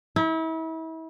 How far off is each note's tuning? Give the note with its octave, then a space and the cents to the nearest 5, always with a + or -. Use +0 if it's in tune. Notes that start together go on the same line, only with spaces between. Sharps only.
E4 -35